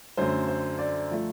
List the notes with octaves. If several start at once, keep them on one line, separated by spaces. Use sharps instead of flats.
F#2 D3 F#3 A3 C5
C5
D5
F3 A3